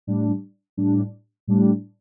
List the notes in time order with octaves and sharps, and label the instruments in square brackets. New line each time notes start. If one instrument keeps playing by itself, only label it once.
[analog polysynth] A2 G3 D4
A2 G3 D4
A2 G3 D4